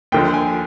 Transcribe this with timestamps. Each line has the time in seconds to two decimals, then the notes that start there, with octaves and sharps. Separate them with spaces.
0.12 D#2 D3 F3 G5
0.34 G#5